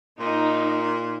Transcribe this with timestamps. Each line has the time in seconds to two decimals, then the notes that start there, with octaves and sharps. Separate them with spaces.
0.20 A#2 D#4